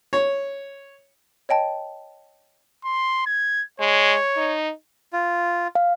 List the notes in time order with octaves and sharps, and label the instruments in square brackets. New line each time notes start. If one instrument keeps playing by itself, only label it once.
[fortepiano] C#5
[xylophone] C#5 D#5 G5 A5
[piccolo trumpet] C6
G#6
[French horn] G#3 [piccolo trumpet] C#5
[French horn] D#4
[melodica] F4
[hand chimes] F5